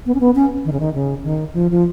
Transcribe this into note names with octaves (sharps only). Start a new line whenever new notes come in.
B3
C#4
B3
C#4
D#3
C#3
D#3
C#3
D#3
F3
F3